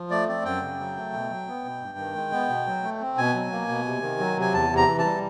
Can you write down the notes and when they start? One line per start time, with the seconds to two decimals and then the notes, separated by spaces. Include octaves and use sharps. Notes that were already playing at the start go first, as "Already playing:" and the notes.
Already playing: F3
0.10 A3 D5
0.28 C4 D5
0.45 F#2 G5
0.62 C#3
0.80 F#3
0.96 A3
1.13 B2
1.30 F#3
1.47 B3
1.65 B2
1.81 G2
1.98 D#3
2.15 G#3
2.32 B3
2.49 B2
2.66 F#3
2.83 A3
3.01 C4
3.18 B2 G#5
3.34 F#3
3.52 A#3
3.69 B2
3.86 C3
4.02 D#3
4.19 F#3
4.37 C3 G#5
4.54 E2 A5
4.70 C3
4.76 A#5
4.88 E3
4.99 A5
5.05 G3